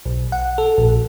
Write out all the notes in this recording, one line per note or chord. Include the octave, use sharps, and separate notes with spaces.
B1
F#5
A4
A#1